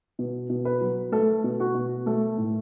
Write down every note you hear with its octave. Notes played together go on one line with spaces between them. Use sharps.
B2
B2
B4
F#3
A3 A4
B2
F#4
B2
A3 A4
A2